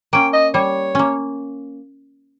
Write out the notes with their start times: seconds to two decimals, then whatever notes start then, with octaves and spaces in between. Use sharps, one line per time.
0.13 A#3 C#4 G5
0.33 D#5
0.54 G3 C#5
0.95 A#3 C#4